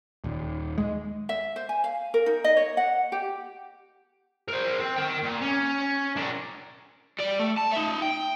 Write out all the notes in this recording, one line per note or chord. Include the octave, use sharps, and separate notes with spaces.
D#1
G#3
E5
C5
G#5
F5
A#4
D#4
D#5
C#5
F#5
G4
A#4 C5
C4
A#4 G5
A#2
C#4
D4 A#4
G3 D5
A3
A5
D#4 E5
G5